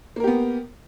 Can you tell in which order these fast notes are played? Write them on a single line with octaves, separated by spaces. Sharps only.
A#3 A#4 G4 B3